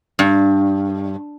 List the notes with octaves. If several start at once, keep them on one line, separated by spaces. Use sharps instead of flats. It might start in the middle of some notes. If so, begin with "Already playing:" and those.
G2